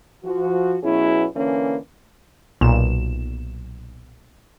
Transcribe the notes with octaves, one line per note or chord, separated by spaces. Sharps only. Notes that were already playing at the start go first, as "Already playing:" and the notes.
F3 F#4
B2 F#3 B3 C#4 E4 G#4
D3 E3 A#3 C#4
B1 A#2 E7